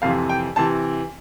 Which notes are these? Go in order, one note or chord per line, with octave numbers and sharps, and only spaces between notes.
F2 C3 E3 F5
G5
C3 E3 A5